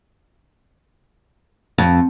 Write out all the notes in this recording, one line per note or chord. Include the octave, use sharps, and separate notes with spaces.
F2